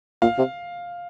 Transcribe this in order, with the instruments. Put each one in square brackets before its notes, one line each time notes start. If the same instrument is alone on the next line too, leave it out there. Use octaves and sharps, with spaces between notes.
[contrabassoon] A#2 [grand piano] F5
[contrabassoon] C3